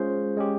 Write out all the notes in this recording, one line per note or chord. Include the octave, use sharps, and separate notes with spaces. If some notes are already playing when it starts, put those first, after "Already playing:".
Already playing: G#3 C#4 F4 G#4 C5
G#3 C#4 G4